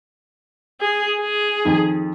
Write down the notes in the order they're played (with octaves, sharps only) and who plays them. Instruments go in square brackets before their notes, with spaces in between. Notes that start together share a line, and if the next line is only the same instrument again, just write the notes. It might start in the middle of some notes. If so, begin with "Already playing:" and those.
[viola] G#4
G#4
[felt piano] F2 D#3